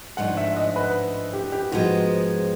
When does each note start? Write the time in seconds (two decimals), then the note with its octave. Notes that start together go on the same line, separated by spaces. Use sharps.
0.17 G#2 F3 A3 D4 F#5
0.37 E5
0.57 D#5
0.76 B4
1.33 G4
1.52 G4
1.72 G#2 F3 G#3 B3 F#4